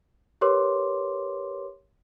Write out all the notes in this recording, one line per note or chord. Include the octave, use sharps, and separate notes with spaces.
G4 A#4 B4 C#5 C6 D6